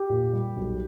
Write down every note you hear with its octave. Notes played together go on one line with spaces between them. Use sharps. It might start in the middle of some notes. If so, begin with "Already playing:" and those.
Already playing: G4
A#2
G3
B1